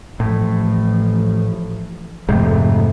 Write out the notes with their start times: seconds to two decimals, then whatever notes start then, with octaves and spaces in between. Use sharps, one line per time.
0.20 A1 A2 F3
2.28 F2 G#2 C3 G#3 A3